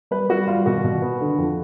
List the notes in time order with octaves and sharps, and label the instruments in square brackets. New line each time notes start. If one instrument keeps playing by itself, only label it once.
[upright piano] G3 B4
G3 F#4
G3 F4
B2 F#4
B2
B3
D3
F2